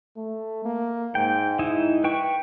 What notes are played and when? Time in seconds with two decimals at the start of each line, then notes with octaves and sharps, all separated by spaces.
0.17 A3
0.65 A#3
1.15 G#2 G5
1.59 D#4 E4
2.04 B4 G5 C#6